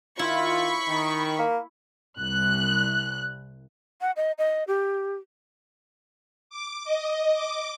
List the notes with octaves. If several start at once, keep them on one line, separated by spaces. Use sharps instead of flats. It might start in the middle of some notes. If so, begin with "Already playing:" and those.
D#3 E4 F4 B5 C#6
D#3
A#3
C2 F#6
F#5
D#5
D#5
G4
D6
D#5
D6